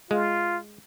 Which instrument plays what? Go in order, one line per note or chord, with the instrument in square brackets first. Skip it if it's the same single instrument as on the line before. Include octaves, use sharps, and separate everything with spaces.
[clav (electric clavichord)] G#3 [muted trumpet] F4